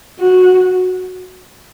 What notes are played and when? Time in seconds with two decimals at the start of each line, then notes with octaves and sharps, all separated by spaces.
0.20 F#4